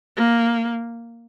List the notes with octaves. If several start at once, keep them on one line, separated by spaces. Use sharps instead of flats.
A#3